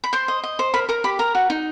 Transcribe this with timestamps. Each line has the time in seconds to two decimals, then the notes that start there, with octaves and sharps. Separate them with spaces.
0.04 B5
0.13 C5 C6
0.28 D#5
0.43 D#5
0.59 C5
0.74 A#4 B5
0.89 A#4 A#5
1.04 G4 B5
1.19 A#4 A#5
1.35 F#4
1.50 D#4